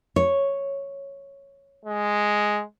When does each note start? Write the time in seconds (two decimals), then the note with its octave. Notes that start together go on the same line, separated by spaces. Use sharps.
0.16 C#5
1.85 G#3